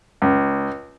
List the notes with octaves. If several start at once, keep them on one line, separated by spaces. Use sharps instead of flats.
C#2